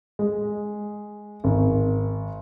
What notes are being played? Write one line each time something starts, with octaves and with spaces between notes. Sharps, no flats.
G#3
G#1